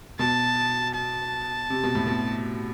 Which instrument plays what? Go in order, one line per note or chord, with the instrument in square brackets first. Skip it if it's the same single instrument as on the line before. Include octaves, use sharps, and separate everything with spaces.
[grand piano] B2 [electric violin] A5
[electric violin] A5
[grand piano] C3
B2
A2
B2